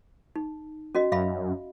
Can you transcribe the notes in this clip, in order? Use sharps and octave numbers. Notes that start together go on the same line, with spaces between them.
D#4
C#4 F#4 D#5
F#2 E5 F5 B5